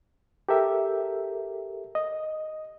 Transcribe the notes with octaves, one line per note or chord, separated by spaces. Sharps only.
G4 A4 A#4 E5
D#5